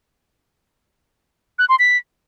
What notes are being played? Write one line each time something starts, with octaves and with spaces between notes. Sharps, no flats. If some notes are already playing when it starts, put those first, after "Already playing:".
F#6
C6
B6